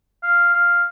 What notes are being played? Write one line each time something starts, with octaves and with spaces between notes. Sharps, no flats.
F5
F5